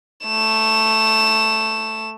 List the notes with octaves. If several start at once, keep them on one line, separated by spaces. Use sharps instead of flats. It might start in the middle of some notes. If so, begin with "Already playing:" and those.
A3 E7